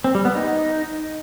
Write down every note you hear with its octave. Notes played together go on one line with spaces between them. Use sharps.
C4
G3
B3
D#4